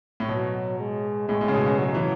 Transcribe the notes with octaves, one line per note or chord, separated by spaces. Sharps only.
A2
B2 F#3
G#3
A2 G#3
A2
C#3
B2
C#3
F#3
E3